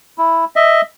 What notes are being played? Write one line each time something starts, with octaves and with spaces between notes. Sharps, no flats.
E4
D#5 E5